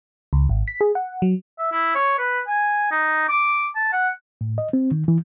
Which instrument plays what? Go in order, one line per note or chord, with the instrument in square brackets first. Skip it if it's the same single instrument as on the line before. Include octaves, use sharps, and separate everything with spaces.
[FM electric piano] C#2
G#1
B6
G#4
F#5
F#3
[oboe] E5
E4
C#5
B4
G#5
D#4
D6
A5
F#5
[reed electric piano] A2
D#5
C4
D#3
E3